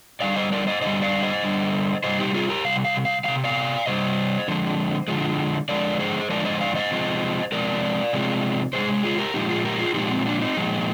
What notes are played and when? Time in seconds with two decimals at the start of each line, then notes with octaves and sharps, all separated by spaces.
0.20 D3 G3 D5 F5
0.36 C5 D#5
0.52 A#4 D5
0.67 C5 D#5
0.82 D3 G3 C5 D#5
1.02 D5 F5
1.23 C5 D#5
1.43 D3 G3
2.04 C3 G3 C5 D#5
2.19 D#4 G4
2.34 F4 G#4
2.49 G4 A#4
2.65 C3 G3 F5
2.85 F5
3.05 F5
3.24 G3 F5
3.28 C3
3.44 D5 F5
3.86 C3 G3 C5 D#5
4.48 D3 F3 G#3
5.08 D3 F3 G#3
5.69 D3 F3 G#3 A#4 D5
5.99 G#4 C5
6.30 D3 F3 G#3 A#4 D5
6.45 C5 D#5
6.61 D5 F5
6.75 C5 D#5
6.90 C3 F3 G#3
7.52 C3 F3 G#3 A#4 D5
8.13 C3 F3 G#3
8.73 C3 F3 G#4 C5
8.78 G#3
9.03 F4 G#4
9.18 G4 A#4
9.34 A#2 F3 G#3 D#4 G4
9.49 F4 G#4
9.65 G4 A#4
9.80 F4 G#4
9.95 A#2 F3 G#3 D#4 G4
10.10 C4
10.26 A#3 D4
10.41 C4 D#4
10.57 A#2 F3 G#3